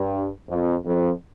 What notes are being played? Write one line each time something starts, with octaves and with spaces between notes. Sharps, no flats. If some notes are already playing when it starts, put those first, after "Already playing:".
Already playing: G2
F2
F2